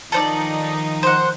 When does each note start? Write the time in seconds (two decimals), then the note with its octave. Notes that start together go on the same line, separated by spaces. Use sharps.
0.12 D#3 F3 D#4 A4 C5 D5
1.03 C5 F#5